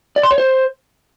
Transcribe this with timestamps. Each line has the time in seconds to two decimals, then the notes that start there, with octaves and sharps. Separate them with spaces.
0.16 D5
0.23 C6
0.31 C#5
0.38 C5